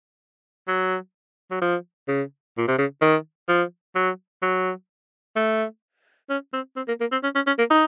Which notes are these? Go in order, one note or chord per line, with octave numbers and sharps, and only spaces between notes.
F#3
F#3
F3
C#3
A#2
C3
C#3
D#3
F3
F#3
F#3
A3
C#4
C4
C4
A#3
A#3
C4
C#4
C#4
C#4
A#3
D#4